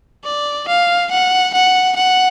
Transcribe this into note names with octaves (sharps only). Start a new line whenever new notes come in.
D5
F5
F#5
F#5
F#5